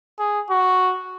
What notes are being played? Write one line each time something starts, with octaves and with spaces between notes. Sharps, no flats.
G#4
F#4